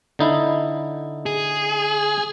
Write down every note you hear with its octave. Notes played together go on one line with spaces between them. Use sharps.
D3 D#4 E4
G#4